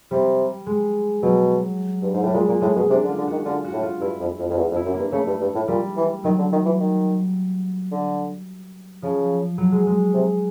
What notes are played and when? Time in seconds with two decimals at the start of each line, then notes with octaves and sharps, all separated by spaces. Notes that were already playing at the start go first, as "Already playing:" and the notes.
0.11 C3 G3
0.66 G#3
1.23 B2 F#3
2.02 G2
2.14 G#2
2.23 A2 G3
2.34 A#2 G#3
2.48 A#2 A#3
2.61 A2 G#3
2.76 B2 G#3
2.90 C3 D4
3.04 D3
3.09 F4
3.18 D3
3.27 D#3 F#4
3.45 D3 F4
3.64 F#4
3.73 A2
3.83 F4
4.01 G2 E4
4.20 F2
4.39 F2
4.50 F2
4.57 E2
4.71 F2
4.76 E4
4.85 F#2
4.94 A#3
4.99 G2
5.12 C#3 A3
5.27 G2
5.41 G2
5.55 A2
5.68 A#2 G3
5.97 E3
6.24 D#3 F#3
6.38 D3
6.52 D#3
6.65 E3
6.80 D#3
7.92 D3
9.02 C#3 F3
9.58 F#3
9.72 G#3
9.87 G#3
10.14 C3